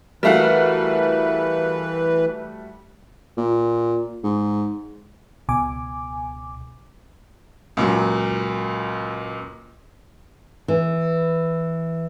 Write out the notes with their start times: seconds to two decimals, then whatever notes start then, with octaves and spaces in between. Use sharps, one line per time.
0.23 E3 G3 A3 F#4 A#4 B4 E5 F5
3.37 A#2
4.24 G#2
5.49 C#2 B2 G#5 D6
7.77 C#2 A#2 F#3
10.68 E3